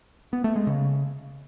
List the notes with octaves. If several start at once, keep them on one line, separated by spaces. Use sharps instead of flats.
B3
A3
G#3
C#3